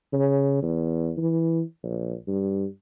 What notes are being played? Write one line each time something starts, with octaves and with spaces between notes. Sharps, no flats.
C#3
E2
E3
A#1
G2